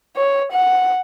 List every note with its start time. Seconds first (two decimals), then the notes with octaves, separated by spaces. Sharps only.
0.16 C#5
0.52 F#5